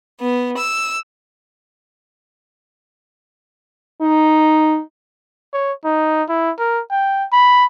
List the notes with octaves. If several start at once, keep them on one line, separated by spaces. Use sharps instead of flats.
B3
E6
D#4
C#5
D#4
E4
A#4
G5
B5